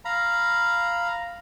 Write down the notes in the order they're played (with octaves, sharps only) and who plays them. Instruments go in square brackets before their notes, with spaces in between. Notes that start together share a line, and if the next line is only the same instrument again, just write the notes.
[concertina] F5 A#5 B5